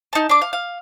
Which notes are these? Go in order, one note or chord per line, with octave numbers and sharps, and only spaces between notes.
D#4 A5
D4 D6
F5
F5